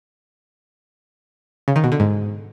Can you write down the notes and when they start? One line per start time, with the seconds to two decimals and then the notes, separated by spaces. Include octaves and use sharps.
1.68 C#3
1.76 D#3
1.84 B2
1.92 D3
2.00 G#2